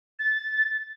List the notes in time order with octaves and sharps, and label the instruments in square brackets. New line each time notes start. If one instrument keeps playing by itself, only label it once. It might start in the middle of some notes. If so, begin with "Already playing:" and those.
[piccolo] A6